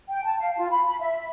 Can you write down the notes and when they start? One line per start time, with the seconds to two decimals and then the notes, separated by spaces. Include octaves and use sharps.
0.10 G5
0.26 A5
0.40 F5
0.57 F4
0.71 B5
0.87 B5
1.01 E5